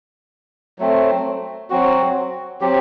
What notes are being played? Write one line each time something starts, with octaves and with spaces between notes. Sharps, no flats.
F#3 A3 C4
F#3 C4 F#4
F#3 C4 G4